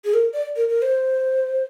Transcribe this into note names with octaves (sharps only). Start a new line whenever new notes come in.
G#4
A#4
D5
A#4
A#4
C5